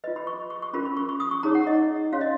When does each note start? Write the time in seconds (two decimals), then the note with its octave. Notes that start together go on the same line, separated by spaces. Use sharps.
0.04 F4 B4 D#5
0.16 B5
0.27 C#6
0.50 C#6
0.62 C#6
0.73 C#4 F4 A#4 B5
0.85 B5
0.97 C#6
1.09 C#6
1.20 D#6
1.31 C#6
1.43 D#4 G#4 C#5 A#5
1.55 F#5
1.67 D#5
2.13 C#4 F#4 C#5 F5
2.21 D#5